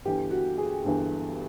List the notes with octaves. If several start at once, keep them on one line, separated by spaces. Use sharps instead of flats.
G1 G2 E3 G4
F#4
G#4
G1 G2 E3